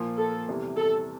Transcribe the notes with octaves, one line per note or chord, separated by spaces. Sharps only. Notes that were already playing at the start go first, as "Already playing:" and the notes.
Already playing: A#2 F3 A#3 F4
A4
E2 C3 E3 G3
A4